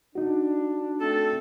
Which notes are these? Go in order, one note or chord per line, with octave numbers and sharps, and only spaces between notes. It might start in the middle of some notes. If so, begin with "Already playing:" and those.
D4 D#4 F#4
A3 C4 A4